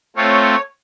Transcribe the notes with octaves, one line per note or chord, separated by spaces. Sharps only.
A3 C4 F4 C#5